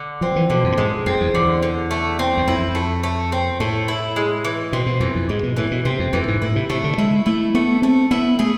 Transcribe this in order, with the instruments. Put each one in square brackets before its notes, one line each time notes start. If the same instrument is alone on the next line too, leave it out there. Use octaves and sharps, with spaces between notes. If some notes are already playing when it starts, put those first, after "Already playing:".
Already playing: [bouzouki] D3
[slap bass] F3 [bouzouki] C4
[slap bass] E3
[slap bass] B2 [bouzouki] D3
[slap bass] F2
A2
[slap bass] G#2 [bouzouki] G#3
[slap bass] F2 [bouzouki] C4
[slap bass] E2
[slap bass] E2 [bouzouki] D3
[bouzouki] D3
A3
C4
[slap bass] E2
[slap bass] F2 [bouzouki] E4
[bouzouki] A3
A3
C4
[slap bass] A2 [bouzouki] A3
[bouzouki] E4
G#3
E3
[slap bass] B2 [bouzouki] C4
[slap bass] B2
[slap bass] F2 [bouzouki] E3
[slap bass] F2
[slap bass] G#2 [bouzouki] G#3
[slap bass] B2
[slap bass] A2 [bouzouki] E3
[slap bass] B2
[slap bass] C3 [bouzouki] C4
[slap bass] F2
[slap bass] F2 [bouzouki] E3
[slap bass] G#2
[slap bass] A2 [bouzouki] E4
[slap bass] C3
[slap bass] C3 [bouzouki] A3
[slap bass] D3
[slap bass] G#3 [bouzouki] E4
[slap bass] A3 [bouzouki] E4
[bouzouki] A3 [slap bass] B3
[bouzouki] A3 [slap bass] C4
[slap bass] B3 [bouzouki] E4
[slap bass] A3 [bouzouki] G#4